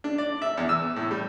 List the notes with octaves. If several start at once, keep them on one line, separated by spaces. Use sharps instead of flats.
D4
D5
E5
E2
E6
A2
G3